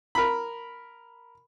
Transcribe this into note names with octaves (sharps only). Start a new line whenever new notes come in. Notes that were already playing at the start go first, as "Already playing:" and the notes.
A#4 B5